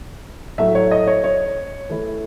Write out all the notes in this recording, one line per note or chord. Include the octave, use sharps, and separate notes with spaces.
A2 F#3 A3 E5
C#5
D#5
C#5
C#5
E3 A3 E4